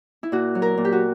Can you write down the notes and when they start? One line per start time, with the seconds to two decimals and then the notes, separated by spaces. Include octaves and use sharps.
0.23 E4
0.32 A#2 F#4
0.55 F#3
0.62 A#4
0.78 A#2
0.85 G4
0.92 F#4